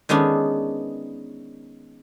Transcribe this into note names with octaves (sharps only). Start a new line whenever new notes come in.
D#3 G#3 B3 C#4 D4